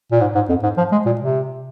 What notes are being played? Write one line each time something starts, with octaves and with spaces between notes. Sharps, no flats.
A#2
G#2
G#2
F2
G#2
F3
G#3
A#2
C3